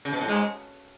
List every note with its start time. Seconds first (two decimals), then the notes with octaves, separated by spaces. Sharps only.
0.05 C#3
0.13 B2
0.21 A2
0.28 G#2 G#3